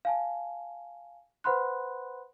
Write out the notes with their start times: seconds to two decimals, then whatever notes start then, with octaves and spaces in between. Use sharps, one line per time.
0.05 F5 G#5 A5
1.44 B4 C5 F#5 B5 C6 F#6